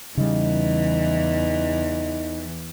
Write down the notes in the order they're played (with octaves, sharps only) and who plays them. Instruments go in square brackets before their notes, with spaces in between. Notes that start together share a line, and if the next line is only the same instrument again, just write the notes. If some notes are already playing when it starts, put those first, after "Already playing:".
[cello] E2 E3 [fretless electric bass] C#3 G3 [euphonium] D#4